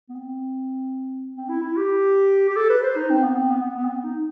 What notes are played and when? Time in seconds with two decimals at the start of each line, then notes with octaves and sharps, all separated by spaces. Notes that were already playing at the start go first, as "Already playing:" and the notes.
0.09 B3
0.16 C4
1.36 C4
1.49 E4
1.63 E4
1.77 G4
2.50 G4
2.56 A4
2.70 B4
2.83 C5
2.96 D#4
3.10 C4
3.23 B3
3.37 C4
3.51 B3
3.64 B3
3.77 B3
3.85 C4
3.90 B3
4.04 D#4